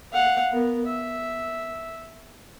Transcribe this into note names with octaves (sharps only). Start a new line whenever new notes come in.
F5 F#5
B3 A#4
E5